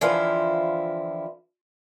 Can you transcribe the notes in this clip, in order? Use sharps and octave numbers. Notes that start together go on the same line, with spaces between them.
D3 E3 F3 C4 E4 F4